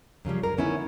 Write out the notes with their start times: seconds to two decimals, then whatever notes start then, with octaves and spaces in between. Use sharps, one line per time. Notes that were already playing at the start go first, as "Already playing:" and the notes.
0.25 F#2 C#3 F3 G3
0.43 A#4
0.57 D3 B3 C#4 D#4 E4